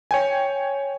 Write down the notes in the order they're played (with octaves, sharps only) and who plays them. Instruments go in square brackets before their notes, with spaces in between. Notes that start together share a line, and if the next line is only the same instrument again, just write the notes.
[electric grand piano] C#5 G5 G#5